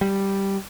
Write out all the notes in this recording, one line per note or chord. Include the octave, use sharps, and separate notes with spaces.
G3